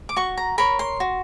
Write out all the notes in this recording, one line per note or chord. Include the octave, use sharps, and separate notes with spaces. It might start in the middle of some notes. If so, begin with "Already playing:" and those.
D6
F#4 C#6
A#5
A#4 C#5 B5
C6
F#4